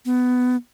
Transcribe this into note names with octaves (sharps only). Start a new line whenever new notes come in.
B3